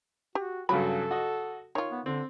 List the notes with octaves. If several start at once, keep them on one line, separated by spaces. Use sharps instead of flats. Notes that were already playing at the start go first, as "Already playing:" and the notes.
F#4 G4
G2 C#3 F#3 A4 B5
F#4 D#5
D#3 F4 C#5
B3
D3 C4